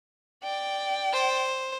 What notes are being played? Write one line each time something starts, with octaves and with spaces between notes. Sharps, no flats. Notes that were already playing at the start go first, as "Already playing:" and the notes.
D5 G5
C5